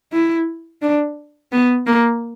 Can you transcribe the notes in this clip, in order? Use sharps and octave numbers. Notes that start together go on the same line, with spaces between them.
E4
D4
B3
A#3